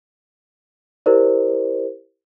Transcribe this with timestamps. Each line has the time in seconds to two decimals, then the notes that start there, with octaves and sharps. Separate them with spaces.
1.06 E4 G4 A#4 C5 D5